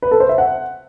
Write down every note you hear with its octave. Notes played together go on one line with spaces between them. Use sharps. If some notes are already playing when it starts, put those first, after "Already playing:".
B4
A4
C5
E5
F#5